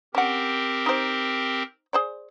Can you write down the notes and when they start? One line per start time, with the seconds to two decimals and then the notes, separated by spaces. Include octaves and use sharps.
0.15 C4 C#4 G4 A#4 F#5
0.86 D#4 C5
1.93 G#4 C5 D5